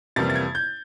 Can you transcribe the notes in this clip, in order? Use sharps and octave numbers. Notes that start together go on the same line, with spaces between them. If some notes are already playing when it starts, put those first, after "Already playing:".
F2 C3 E3 G3 A#3 A6
A6
G#6
G6